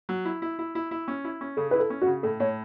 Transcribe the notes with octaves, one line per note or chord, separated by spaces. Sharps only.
F#3
E4
E4
E4
E4
E4
C#4
E4
C#4
C#3 A4
E4 B4
A4
C#4
F#4
C#3
A2 A4
A2 C#5